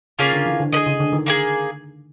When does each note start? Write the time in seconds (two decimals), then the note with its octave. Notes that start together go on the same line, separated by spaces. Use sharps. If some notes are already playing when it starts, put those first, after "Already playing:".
0.19 C#3 A#3 C#4 F4 G#4
0.33 D3
0.46 E3
0.60 D3
0.73 D3 G#4 B4 D#5
0.86 C#3
1.00 D3
1.13 D#3
1.26 A#3 D#4 G#4